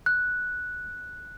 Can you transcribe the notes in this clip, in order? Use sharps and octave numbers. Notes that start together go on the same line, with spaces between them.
F#6